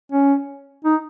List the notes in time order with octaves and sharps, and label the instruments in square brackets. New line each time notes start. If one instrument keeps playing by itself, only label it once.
[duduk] C#4
D#4